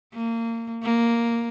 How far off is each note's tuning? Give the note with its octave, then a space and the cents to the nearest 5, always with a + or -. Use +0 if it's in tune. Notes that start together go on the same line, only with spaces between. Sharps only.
A#3 -25
A#3 +0